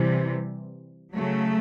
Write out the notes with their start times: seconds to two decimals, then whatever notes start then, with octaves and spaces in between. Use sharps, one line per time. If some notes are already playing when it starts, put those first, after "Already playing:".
Already playing: C3 E3 G3
1.14 C#3 F#3 A3